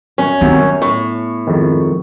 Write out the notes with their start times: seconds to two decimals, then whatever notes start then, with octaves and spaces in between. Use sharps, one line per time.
0.18 F#2 C#4
0.41 C3 D#3 F#3 B3
0.59 F#2
0.82 A2 C#6
1.47 F2 G#2 D#3